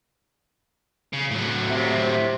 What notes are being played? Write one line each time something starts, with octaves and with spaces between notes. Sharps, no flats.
C#3
A2 F#3
C3